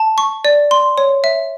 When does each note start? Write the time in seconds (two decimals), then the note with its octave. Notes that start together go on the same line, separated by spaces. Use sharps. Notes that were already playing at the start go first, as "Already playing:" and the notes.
Already playing: A5
0.18 C#6
0.45 D5
0.71 C6
0.98 C#5
1.24 E5